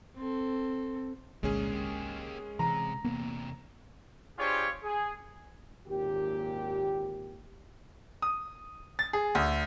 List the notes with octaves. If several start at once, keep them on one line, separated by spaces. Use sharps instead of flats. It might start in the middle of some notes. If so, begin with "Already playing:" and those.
C4 A4
G1 C2 A#2 D3 G#3 C#4 G#4
A#3 G4
C3 E3 A#5
E2 C3 A#3 B3
D4 F4 G4 G#4 C5 C#5
G#4
G#1 D#2 A#2 G4
D#6
A6
G#4
D2